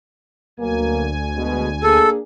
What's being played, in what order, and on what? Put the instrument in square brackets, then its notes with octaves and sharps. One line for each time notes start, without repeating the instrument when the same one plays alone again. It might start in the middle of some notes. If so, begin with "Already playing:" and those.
[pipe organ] D2 G#5 [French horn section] B2 F#3 A#3
[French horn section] B2 G#3
[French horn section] A#3 D4 G#4 [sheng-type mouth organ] A4